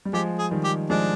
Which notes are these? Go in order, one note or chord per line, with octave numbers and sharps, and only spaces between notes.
G3
F3 G#3 G4
G#4
D#3 G3
G4
F3 G#3 D4